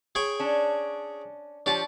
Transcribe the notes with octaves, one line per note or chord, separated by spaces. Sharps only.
G#4 C#5 G5
C#4 D4
F3 D4 G4 C#5 A5